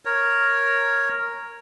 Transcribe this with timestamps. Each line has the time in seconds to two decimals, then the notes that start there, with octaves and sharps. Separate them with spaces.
0.05 A#4 C#5